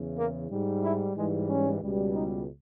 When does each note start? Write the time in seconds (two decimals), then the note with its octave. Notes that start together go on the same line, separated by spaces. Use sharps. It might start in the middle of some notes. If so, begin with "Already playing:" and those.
Already playing: E2 C#3 E3
0.17 A#3
0.50 G#2 G3
0.83 E4
1.16 G#2 E3 G3 G#3
1.49 C#4
1.81 C#2 B2 G3
2.14 D#4